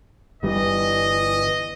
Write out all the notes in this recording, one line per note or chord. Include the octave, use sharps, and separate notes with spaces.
G1 E3 G3 D#5